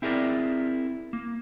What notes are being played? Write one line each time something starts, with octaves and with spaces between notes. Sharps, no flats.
C4 E4 G#4 A#4 B4 D5
A#3